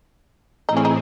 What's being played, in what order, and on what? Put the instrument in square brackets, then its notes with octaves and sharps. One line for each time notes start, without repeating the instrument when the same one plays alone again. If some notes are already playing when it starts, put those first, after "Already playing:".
[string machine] A2 E3 C4 E4 G#4 [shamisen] D#4
[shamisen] C#4
D#4